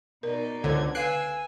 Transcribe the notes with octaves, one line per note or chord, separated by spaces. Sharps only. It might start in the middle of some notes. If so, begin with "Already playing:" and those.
B2 D#4 A#4 D5
C#2 D3 A4 C5 C#5 G#6
B4 F5 G#5 E6 F#6 C7 D7